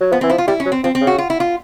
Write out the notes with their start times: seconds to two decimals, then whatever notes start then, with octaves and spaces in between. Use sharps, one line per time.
0.01 F#3
0.12 F3 B3
0.21 E3 C4
0.30 F3 E4
0.38 F4
0.48 G3 E4
0.60 C#4
0.66 F#3
0.72 C4
0.84 F3 C4
0.95 C4
1.01 C#3
1.07 F#4
1.18 F4
1.30 E4
1.40 F4